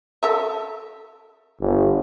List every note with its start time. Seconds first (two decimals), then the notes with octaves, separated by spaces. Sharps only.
0.23 A4 A#4 E5
1.60 G1